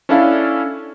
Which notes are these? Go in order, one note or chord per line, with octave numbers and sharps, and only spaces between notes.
C#4 D4 E4 A4 F5